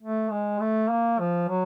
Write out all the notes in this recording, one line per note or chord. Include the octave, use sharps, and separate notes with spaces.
A3
G#3
A3
A#3
F3
F#3